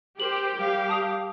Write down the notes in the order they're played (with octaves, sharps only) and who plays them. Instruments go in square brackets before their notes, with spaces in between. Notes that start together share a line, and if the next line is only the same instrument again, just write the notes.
[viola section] G4 [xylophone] A#4 F#7 [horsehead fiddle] C5
[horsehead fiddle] G3 F5
[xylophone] A5 D#6 F7